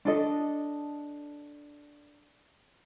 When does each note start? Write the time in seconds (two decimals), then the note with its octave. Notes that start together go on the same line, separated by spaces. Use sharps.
0.05 D4 A4 D#5